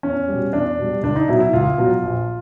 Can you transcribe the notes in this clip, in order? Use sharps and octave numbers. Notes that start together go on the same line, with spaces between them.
E2 C#4
B2 G3
E2 D4
B2 G3
C#2 D4
D#4
B2 F#3 E4
E4
C#2 F4
B2 F#3
A#1